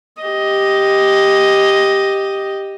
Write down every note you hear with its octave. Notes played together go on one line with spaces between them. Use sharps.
G4 D#5